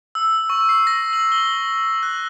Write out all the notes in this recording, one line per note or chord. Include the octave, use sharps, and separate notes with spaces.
E6
C#6
C7
A#6
F#7
G7
F#6